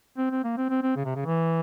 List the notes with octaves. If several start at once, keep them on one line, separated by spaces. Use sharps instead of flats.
C4
C4
A#3
C4
C4
C4
C#3
C3
C#3
E3